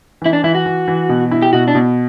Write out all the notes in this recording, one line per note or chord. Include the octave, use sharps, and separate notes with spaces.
E3 E4
D4
E3 E4
F#4
E3
E3
B2
E4
G4
B2 F#4
D4
B2